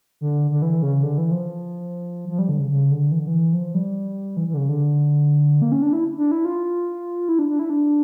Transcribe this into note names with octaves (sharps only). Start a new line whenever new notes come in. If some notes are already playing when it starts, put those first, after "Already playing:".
D3
D3
E3
C#3
D3
E3
F3
F3
G3
D3
C#3
C#3
D3
E3
D3
E3
F3
G3
E3
E3
D3
C#3
D3
A#3
C#4
D4
E4
D4
E4
F4
E4
D4
D4
E4
D4